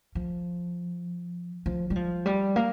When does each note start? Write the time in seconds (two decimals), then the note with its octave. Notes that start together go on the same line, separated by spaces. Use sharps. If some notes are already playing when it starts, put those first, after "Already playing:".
0.15 F3
1.66 F3
1.90 G3
1.96 F3
2.26 G3
2.56 A#3